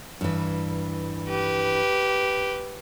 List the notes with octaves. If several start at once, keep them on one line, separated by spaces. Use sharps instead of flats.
G2 E3
G4 B4